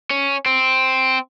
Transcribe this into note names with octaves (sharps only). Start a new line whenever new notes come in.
C#4
C4